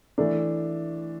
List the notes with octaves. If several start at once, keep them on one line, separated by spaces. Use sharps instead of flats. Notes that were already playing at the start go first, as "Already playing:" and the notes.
E3 A3 D4